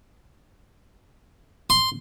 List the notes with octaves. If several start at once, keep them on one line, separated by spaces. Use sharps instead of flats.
C6